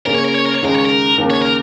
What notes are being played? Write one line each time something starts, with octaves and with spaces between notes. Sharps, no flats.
C#3 A#3 C#4 A#4
C#5
A#4
C#5
A#4
C#5
D#2 C#3 G#3 A#4
C#5
A#4
D#2 C#3 A#3
C#5
A#4